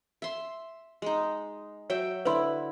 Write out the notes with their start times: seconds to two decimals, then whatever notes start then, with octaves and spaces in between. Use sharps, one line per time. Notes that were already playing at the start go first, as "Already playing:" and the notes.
0.22 E5 C6
1.02 G#3 D#4
1.90 F#3 C#5 E5 G5
2.25 D3 E4 B4 C6